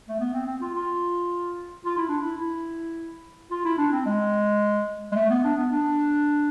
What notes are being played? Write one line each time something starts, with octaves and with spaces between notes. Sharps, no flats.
A3
B3
C4
C4
F4
F4
F4
E4
D4
E4
E4
F4
E4
D4
C4
G#3
G#3
A3
B3
D4
B3
D4